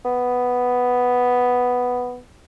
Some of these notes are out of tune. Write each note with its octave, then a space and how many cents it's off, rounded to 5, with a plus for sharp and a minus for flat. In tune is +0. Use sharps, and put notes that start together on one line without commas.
B3 +0